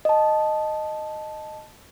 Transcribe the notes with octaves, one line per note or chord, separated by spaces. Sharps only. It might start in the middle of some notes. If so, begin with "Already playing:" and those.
D#5 A5